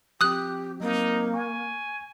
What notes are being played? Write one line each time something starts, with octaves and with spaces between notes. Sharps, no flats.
F3 C4 G4 D#6 F#6
F#3 A#3 C4 D#4
G#5 C#6